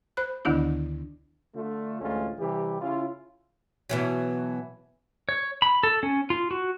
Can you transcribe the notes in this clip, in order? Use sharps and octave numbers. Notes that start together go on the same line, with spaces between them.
C5 B5 F#6
D2 D3 D#3 B3 D4 E4
D3 A3 F4
A1 D2 G#3 A3 C#4 F4
C3 E3 G3 G4
C#3 C#4 E4 F4
B2 E3 F#3
C#5
B5
A4
C#4
F4
F#4